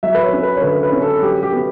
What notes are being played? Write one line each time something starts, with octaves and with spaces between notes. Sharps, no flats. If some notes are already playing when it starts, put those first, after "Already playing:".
F#3 E5
B4
C#5
C#4
B4
C#5
D3 B4
B4
C#4
A4
F#3 G4
G4
B3